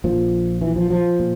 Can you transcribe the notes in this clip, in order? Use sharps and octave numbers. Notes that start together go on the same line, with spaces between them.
A#1 A#2 F3
E3
F3
F3
A#2